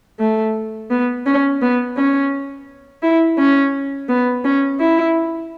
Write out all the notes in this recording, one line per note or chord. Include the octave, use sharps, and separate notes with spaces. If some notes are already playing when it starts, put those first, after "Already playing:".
A3
B3
C#4
B3
C#4
E4
C#4
B3
C#4
E4